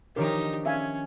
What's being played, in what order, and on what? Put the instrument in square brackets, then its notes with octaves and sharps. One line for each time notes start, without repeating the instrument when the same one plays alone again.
[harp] D#3 F3 D4 [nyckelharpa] D#4 G4 [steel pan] A#4 C#5
[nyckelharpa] C#4 [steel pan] E5 F5 G#5